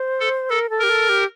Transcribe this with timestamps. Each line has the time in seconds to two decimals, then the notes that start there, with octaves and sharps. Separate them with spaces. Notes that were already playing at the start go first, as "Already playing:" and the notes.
Already playing: C5
0.20 A4
0.50 A4 A#4
0.70 A4
0.79 G4 A#4
0.89 A4
1.09 G4